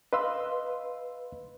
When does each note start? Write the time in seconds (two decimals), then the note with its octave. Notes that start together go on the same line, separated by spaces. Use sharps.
0.13 B4 D#5 F5 C6 E6